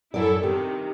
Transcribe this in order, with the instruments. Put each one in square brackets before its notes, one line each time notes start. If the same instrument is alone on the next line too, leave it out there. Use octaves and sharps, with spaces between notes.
[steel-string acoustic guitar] F#2 D5 [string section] E4 A4
[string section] C3 D#3 [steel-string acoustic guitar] G4